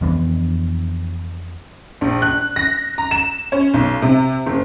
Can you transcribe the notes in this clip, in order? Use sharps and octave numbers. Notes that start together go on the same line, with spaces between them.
F2 E3 B3 D4
A#1
F#6
A#6
A#5
E7
C#4
B1
C3
F#1